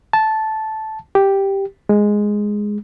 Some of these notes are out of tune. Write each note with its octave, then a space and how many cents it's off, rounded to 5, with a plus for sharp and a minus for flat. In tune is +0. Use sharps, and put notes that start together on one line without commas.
A5 -10
G4 +0
G#3 -5